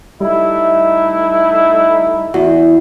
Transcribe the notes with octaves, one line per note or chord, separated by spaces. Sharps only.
G3 A3 D#4 E4
E2 F#4